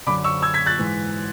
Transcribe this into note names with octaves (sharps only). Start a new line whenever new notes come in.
F#2 D3 B5 D6
C#6 E6
E6 G#6
G#6 B6
F#6 A6
G#2 E3